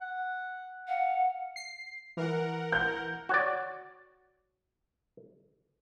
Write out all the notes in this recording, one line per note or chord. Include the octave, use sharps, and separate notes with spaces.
F#5
F5 F#5
C7
E3 A#4 F#5
G6
F#4 C#5 D5